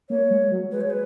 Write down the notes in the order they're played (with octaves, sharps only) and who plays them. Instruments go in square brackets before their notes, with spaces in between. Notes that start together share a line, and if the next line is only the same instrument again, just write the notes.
[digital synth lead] A#3 [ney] C#5
[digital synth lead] G#3
F#3
[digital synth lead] G#3 [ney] B4
[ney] C#5
B4